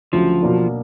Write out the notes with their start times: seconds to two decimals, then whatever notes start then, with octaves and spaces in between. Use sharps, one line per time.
0.12 D2 C#3 F3 F#3
0.42 B2 F#3 A#3 D4